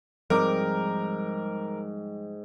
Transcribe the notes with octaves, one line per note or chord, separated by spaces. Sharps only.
G#2 F3 G3 C4 A#4 G5 D6